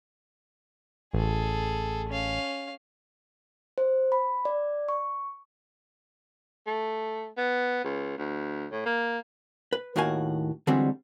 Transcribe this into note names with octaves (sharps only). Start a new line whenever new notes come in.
A1 G#4 A4
C#4 F5
C5
B5
D5
C#6
A3
B3
C#2
D2
A2
A#3
B4
D#2 A2 D#3 F#4 F5 G#5
D3 E3 G3 G#3 C4 F#4